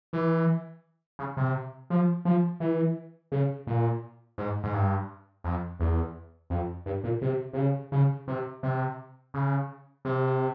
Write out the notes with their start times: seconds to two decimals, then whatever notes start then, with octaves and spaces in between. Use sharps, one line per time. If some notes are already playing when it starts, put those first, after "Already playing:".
0.13 E3
1.19 C#3
1.37 C3
1.90 F3
2.25 F3
2.60 E3
3.32 C#3
3.67 A#2
4.38 G#2
4.64 G#2
4.74 G2
5.44 F2
5.80 E2
6.50 F2
6.86 G2
7.04 A#2
7.22 C3
7.53 C3
7.57 C#3
7.92 C#3
8.28 C3
8.63 C3
9.34 C#3
10.05 C3